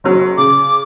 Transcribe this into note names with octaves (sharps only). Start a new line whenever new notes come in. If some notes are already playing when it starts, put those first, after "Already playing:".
F#1 F#3
C#3 D6